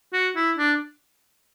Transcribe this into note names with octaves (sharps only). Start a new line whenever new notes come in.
F#4
E4
D4